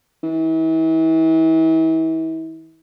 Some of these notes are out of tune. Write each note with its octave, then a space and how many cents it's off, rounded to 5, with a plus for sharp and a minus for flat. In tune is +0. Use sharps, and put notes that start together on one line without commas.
E3 -35